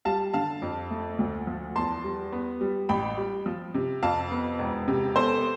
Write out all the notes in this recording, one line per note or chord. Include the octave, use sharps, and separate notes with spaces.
G3 F5 A5
D3 F5 A5
F2
A3
D2
F3
E2 A5 C6
G3
B3
G3
A1 G5 B5
G3
F3
C3
F2 F5 A5
B3
E1
C3
B3 A4 C5